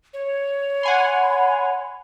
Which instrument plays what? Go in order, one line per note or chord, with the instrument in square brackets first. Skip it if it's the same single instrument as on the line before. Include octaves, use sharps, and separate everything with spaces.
[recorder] C#5
[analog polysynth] F#5 G#5 C6 [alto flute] B5